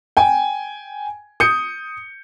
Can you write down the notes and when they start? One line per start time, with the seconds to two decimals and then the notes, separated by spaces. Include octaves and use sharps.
0.17 G5 G#5
1.40 D#6 G6 C#7